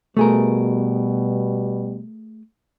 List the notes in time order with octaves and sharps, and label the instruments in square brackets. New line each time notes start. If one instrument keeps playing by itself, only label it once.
[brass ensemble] B2 G3 [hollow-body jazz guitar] A3 G#4 A#4